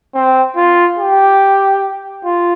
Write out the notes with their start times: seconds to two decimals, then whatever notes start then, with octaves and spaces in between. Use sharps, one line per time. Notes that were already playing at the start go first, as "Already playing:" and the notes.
0.14 C4
0.56 F4
0.98 G4
2.24 F4